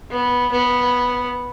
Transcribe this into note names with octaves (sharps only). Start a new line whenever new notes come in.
B3
B3